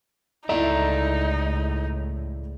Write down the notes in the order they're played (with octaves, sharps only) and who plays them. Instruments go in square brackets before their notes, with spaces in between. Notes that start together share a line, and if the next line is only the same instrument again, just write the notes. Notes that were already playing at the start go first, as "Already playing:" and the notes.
[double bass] C#2 A2 [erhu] D#4 [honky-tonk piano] E4 E5 [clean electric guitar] A4 D5 A#5